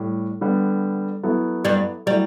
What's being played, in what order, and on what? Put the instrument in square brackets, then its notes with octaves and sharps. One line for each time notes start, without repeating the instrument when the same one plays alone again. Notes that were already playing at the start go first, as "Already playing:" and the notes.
Already playing: [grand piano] A2 G3
D3 G3 B3
F#3 B3 E4 A4
[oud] G2 G3
[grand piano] F#3 A3 E4 [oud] G3